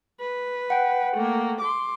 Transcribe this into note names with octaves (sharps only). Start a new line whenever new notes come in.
B4
F#5 G5
A3 A#3
C6 D6